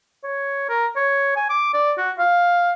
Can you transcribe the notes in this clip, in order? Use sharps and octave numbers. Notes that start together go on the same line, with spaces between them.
C#5
A#4
C#5
G#5
D6
D5
F#4
F5